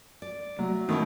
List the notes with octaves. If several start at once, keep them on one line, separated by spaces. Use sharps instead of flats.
D5
F#3 A3 F#4
B2 D#3 A3 C#4 E4